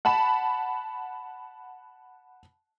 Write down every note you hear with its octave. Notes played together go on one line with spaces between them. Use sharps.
F#5 A5 B5 E7